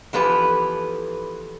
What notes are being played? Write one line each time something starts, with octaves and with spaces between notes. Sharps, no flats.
E3 F3 B3 G4 A4 B4